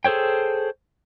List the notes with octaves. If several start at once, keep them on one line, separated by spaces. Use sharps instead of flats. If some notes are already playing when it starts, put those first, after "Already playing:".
G#4 A4 C5 C#5 G5